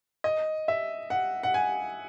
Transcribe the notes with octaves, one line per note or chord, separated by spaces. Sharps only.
D#5
E5
F#5
F#5
G#5